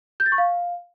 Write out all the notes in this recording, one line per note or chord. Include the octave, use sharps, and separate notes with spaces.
G6
A6
C#6
F5